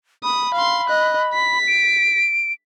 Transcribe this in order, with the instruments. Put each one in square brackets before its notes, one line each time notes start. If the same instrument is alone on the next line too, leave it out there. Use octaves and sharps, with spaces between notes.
[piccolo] B5 [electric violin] D#6
[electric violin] F5 C6
D#5 F#6
B6
[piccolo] D7